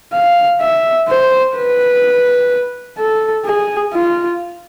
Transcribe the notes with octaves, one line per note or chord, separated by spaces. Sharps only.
F5
E5
C5
B4
A4
G#4
F4